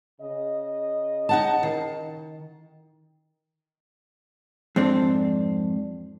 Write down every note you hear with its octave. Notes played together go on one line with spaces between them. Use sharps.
C#3 D#5
D#4 F#5 A5
D#3
F2 G#2 C4 D4